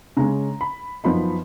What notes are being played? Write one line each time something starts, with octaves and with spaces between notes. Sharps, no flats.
C#3 G#3 C#4 A#5
B5
F#2 F3 B3 D#4 B5